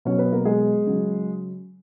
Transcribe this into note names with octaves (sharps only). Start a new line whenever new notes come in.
B2 F#3 C#4 C#5
B3 B4
A#3 A#4
G#3 G#4
C#3 F#3